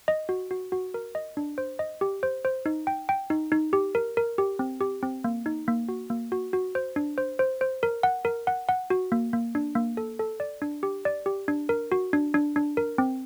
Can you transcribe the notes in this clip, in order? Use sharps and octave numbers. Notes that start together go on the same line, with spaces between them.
D#5
F#4
F#4
F#4
A#4
D#5
D4
C5
D#5
G4
C5
C5
D#4
G5
G5
D#4
D#4
G4
A#4
A#4
G4
C4
G4
C4
A#3
D#4
A#3
F#4
A#3
F#4
F#4
C5
D4
C5
C5
C5
A#4
F#5
A#4
F#5
F#5
F#4
A#3
A#3
D4
A#3
A4
A4
D5
D4
G4
D5
G4
D4
A#4
F#4
D4
D4
D4
A#4
C4